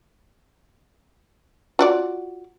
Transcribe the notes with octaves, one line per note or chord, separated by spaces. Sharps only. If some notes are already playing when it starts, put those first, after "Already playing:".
F4 F#4 D5